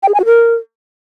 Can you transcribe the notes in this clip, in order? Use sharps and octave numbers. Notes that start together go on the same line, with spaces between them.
G5
G#4
G#5
F#4
A#4